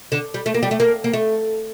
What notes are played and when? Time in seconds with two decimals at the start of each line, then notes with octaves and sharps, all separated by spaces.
0.12 D3
0.34 G3
0.46 A3
0.54 A#3
0.63 G3
0.71 A3
0.80 A#3
1.04 A#3
1.13 A3